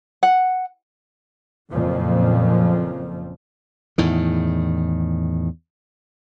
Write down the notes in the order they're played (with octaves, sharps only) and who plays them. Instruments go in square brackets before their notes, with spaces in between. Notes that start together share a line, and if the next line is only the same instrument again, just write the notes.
[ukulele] F#5
[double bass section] F#1 F2 A#2 F3
[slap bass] E2 A2 D#3